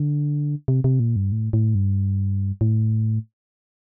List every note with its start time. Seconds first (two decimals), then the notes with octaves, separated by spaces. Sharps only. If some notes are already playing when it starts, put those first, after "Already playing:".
Already playing: D3
0.68 C3
0.84 C3
1.00 A#2
1.16 G2
1.32 A2
1.53 A2
1.75 G2
2.61 A2